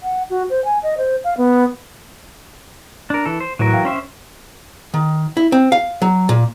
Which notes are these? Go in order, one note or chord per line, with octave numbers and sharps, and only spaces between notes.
F#5
F#4
C5
G#5
D#5
C5
F5
B3
D4 A#4
E3 A4
C5
A2 E3 F#3 A#4
F5 G5
C#4 C5 E5
D#3
E4
C4
F5
F#3
A#2